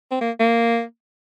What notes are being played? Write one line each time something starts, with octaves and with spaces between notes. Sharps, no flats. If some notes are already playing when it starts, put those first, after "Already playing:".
C4
A#3
A#3